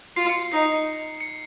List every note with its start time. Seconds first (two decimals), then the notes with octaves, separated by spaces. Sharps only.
0.16 F4 C7
0.29 C#7
0.40 C7
0.52 D#4 C7
1.20 C#7